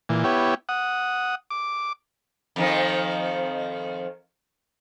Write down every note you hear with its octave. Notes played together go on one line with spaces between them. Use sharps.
A#2 E3
B3 E4 G4 C#5
F#5 D#6
D6
F2 D#3 F3